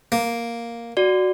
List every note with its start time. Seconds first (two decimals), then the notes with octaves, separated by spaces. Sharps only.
0.12 A#3
0.97 F#4 D5